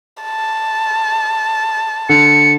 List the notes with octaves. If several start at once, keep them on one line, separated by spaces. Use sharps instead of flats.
A5
D3 C#7